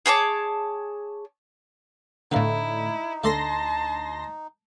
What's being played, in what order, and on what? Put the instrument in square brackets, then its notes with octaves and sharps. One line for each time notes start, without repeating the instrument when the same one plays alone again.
[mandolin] G#4 C#5 A5 D6
[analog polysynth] A2 D3 [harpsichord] B3 B4 F5 [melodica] D#4 [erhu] E4
[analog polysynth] D2 C6 A#6 [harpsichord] A3 A4 D5 [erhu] A5